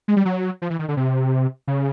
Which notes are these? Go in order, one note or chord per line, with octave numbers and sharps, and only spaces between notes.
G#3
G3
F#3
F3
E3
D#3
D3
C3
C#3